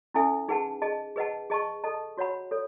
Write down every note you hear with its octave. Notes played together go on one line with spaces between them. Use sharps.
C#4 E4 A4 E5 G#5
D#4 G#4 B4 F#5 A5
G#4 D#5 A5
G#4 B4 D#5 F#5 A5
G#4 D#5 A5 C#6
A4 D#5 A5
F#4 C#5 F#5 B5
A4 C#5